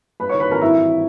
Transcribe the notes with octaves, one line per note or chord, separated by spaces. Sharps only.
G2 B4 B5
C#5 C#6
D#3
B4 B5
G#1 A#4 A#5
G2 E4 E5
E3